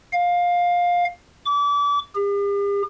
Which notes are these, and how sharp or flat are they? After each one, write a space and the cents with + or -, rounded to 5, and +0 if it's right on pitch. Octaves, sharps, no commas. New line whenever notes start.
F5 +15
D6 -35
G4 +45